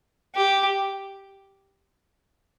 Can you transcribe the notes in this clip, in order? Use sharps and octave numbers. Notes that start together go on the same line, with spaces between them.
G4